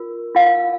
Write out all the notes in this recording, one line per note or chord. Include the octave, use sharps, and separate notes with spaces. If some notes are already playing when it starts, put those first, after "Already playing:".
Already playing: F4 A#4
F4 A#4 F5